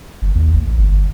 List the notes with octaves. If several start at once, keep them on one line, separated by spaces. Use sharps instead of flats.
G1
D#2
A1
G1